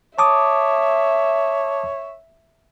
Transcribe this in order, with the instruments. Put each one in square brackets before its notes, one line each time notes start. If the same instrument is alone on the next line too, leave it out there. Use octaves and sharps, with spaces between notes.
[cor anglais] C#5 [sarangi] E5 [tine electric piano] A5 D6 D#6